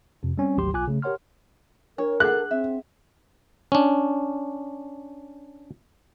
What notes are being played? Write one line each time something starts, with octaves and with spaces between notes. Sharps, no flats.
F2 C3
G3 C4 C#4
G#1 D2 F#3 G4 C6
B1 F4 G#5 D6 F#6
C#3 A3
G4 A#4 C#5 F#5 C6 F6
D4 A#4 C#5
G#4 A4 F#5 F#6
C4 E5
C#4 D4